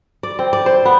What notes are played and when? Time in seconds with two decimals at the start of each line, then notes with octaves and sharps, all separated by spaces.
0.23 D5
0.39 C4
0.53 D5
0.66 C5
0.85 B3